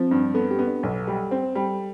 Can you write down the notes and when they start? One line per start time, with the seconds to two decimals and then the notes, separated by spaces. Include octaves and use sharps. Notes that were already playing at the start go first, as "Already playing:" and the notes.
Already playing: F3 C4
0.11 G2
0.34 B3 A4
0.51 G4
0.59 B3
0.67 D4
0.83 B1 A4
1.07 G3
1.31 C4
1.55 G3